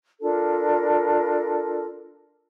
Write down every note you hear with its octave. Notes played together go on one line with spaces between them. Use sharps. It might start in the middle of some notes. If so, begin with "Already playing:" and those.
D4 F4 A4 A#4